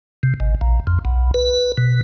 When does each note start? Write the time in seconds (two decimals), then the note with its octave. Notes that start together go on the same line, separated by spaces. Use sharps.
0.23 C3
0.40 G#1
0.61 A#1
0.87 F2
1.05 B1
1.34 B4
1.78 B2